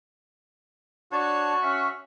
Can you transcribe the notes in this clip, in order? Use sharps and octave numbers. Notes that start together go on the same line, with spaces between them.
D4 F#4 C#5 A5
C#4 E5